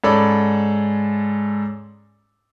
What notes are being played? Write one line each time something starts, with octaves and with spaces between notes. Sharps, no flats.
G#2 C#4 A4 D5 B5